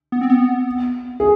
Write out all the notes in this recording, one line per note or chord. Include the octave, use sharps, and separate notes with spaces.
B3
C4
B3
G#4